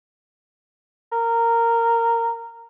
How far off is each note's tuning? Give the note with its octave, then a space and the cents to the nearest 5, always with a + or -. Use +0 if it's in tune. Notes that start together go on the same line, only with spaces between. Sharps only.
A#4 -15